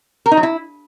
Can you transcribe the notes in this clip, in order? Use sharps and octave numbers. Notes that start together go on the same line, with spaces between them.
A#4
D#4
F#3
E4